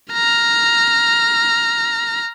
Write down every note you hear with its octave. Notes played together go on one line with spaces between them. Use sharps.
A#5 F6